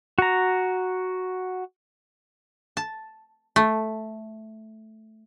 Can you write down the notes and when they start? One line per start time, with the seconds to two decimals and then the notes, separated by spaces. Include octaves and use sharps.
0.18 F#4 A#5
2.77 A5
3.56 A3